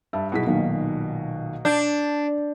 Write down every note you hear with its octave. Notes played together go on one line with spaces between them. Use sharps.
G2 E5 A5
B2 F#3 D#4 E4 G#4 B6
B1 A#2 D#3
D4 G6